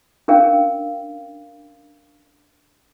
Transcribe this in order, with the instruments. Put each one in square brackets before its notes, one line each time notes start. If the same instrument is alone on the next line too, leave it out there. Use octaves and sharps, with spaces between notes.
[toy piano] C#4 D4 A#4 F5 G5